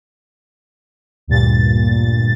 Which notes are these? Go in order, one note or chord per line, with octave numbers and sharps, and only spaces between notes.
D2 G2 A#2 A6